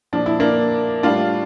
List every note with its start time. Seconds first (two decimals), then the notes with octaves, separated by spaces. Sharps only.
0.13 A#2 F3 D4
0.26 E4
0.40 A#3 D4
1.03 A2 G3 D4 F4